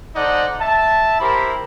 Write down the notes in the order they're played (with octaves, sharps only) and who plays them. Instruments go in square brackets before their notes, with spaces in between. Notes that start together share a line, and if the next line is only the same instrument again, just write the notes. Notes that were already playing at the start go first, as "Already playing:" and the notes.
[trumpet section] D#4 A4 C5 D5 D#5 F#5
E5 A5
E4 G4 A#4 C5 B5